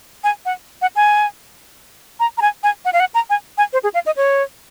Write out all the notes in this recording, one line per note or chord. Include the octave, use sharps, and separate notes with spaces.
G#5
F#5
F#5
G#5
A#5
A#5
G#5
G#5
F#5
F5
F#5
A#5
G#5
G#5
C5
G#4
F5
D#5
C#5